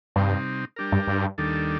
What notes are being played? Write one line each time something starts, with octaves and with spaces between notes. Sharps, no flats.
G2 C3 G3 C4 D#4
G3 D4 G4 A#4
G2
G2
D#2 D#3 G3 D4 A4